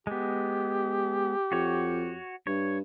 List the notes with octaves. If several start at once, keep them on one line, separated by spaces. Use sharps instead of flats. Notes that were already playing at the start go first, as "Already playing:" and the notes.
G#3 B3 G4
F2 F#4 C#5
G2 C#5